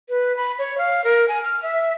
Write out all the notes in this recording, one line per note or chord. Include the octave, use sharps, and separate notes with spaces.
B4
B5
C#5
F5
A#4
G#5
F6
E5